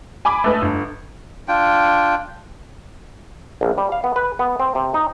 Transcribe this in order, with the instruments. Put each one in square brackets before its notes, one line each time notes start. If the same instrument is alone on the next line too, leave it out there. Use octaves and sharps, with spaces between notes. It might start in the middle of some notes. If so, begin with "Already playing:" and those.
[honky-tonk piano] G#5 B5 D6
A3 B4 D#5
G1
[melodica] D4 F4 G5
[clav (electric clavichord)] A#1
G3
F5
B3
B4
B3
C4
C3
D#4